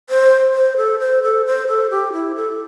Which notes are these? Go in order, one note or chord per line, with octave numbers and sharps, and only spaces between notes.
C5
C5
A4
C5
A4
C5
A4
G4
E4
A4